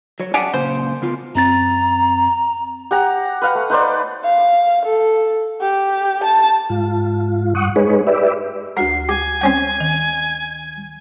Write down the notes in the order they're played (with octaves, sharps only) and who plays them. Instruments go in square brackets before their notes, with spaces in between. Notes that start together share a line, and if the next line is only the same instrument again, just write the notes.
[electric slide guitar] F#3 C#5
[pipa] C#4 G4 G#4 [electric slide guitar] D5 F#5 A5
[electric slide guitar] F#2 A#2 C#3 [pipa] C5
[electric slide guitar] C#3 B3 F4
[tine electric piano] F#2 C4 A6 [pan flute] A#5
[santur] G4 F#5 A#5
B4 F5 F#5
A3
D#4 B4 C5 D5
[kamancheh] F5
A4
G4
A5
[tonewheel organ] G#2 F4
G2 F#5 C#6 D#6
G#3 D#4 G#4 B4 C#5
G4 B4 D5 E5
[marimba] D2 F#4 F#5 [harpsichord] A#4 [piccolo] C7
[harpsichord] G4 [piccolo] G#5
[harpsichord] C4 C#4 G5
[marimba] D#3